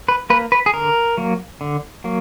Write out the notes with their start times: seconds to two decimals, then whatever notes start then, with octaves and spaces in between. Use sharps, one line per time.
0.09 B4
0.30 A#3 B4
0.52 B4
0.66 G#4
0.74 D3 A#4
1.17 F#3 A#3
1.61 D3
2.04 F#3 A#3